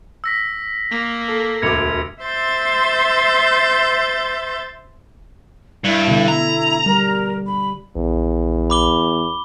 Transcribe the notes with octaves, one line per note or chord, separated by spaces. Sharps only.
E6 A#6 B6
A#3
A4
E1 D2 D6 G#6 C#7 F7
C5 E5 C6 E6 G6 A6
G2 E4
B2 D3
A#5
G3 A#4
B5
A#1 E2
B5 D6 G7